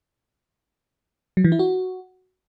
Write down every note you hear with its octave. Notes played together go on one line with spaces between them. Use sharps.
F#3
E3
E4
F#4